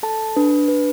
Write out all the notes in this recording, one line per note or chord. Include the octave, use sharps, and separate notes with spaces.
A4 A5
D4 B4
D4 B4